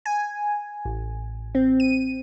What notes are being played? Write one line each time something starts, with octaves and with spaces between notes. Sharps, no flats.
G#5
A1
C4
D#7